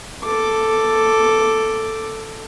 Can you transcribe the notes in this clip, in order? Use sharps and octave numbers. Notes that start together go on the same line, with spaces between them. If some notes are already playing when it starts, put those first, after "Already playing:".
A4 D6